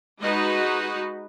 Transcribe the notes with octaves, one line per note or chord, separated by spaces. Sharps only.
G#3 D#4 F#4 B4 D#5